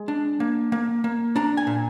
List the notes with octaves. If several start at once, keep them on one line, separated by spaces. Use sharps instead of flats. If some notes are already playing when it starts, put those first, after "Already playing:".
Already playing: G#3
D4
A#3
A#3
A#3
D4 A#5
G#5
A#2